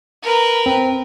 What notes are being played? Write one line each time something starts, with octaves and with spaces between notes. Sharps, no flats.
A#4 B4
C4